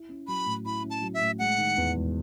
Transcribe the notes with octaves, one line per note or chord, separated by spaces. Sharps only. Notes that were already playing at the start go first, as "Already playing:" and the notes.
Already playing: E4
C#4
F#3 B5
A2
E4 B5
C#4
A5
F#3
E5
A2
G#3 F#5
D#3
E2
E1